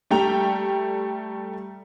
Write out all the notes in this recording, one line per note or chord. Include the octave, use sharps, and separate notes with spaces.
G3 A3 G5 A#5 F7